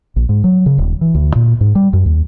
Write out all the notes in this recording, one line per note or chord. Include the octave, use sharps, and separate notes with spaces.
A#1
G#2
F#3
C#3
D#1
E3
D2
A#2
G#2
G3
F#2
D#2